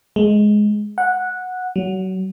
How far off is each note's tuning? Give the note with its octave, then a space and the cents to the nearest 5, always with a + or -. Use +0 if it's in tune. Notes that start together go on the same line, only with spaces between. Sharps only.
G#3 +10
F#5 -10
F#3 +30